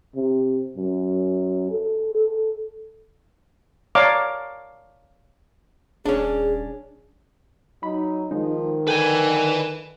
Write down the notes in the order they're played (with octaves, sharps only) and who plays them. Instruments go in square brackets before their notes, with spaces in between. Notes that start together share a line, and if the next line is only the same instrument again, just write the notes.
[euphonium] C3
F#2
A4
A4
[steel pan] C#5 D5 F5 A5 A#5 D6
[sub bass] D#1 [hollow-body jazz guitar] C#4 D4 [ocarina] G#4
[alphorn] F#3 [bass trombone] D#4 [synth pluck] B5
[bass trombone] D#3 [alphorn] F3 [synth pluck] G#3 D#4
[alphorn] D3 [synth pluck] A4 G5 [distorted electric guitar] B4 G#5